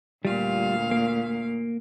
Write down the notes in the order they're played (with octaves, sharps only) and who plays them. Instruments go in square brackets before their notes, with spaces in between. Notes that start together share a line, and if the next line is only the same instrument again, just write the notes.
[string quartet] D2 A#2 F5 [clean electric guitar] G3 F4
[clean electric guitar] A#3